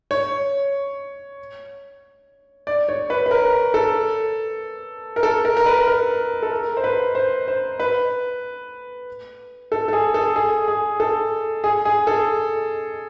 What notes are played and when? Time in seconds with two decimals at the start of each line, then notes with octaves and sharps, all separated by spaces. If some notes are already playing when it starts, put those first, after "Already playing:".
0.11 C#5
2.67 D5
2.89 C#5
3.10 B4
3.26 B4
3.31 A#4
3.74 A4
5.16 A#4
5.23 A4
5.45 A#4
5.57 A#4
5.66 B4
5.87 A#4
6.43 A4
6.51 A#4
6.77 C5
6.84 B4
7.15 C5
7.48 C5
7.79 B4
9.72 A4
9.88 A4
9.93 G#4
10.14 A4
10.36 G#4
10.68 G#4
11.00 A4
11.64 G#4
11.85 G#4
12.07 A4